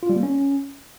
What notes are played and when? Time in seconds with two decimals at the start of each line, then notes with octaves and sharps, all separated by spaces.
0.03 F4
0.09 G3
0.16 A#3
0.23 C#4